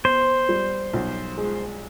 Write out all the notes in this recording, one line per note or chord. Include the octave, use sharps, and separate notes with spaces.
B3 C5
G3
B1
G#3